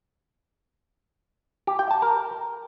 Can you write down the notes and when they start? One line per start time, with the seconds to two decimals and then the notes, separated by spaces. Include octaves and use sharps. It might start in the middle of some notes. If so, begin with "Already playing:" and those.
1.67 G4
1.79 G5
1.91 A5
2.02 A#4